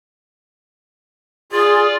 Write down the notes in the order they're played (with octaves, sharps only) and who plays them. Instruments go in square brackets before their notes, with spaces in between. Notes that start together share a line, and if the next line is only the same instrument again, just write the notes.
[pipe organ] F4 D5 [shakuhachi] G#4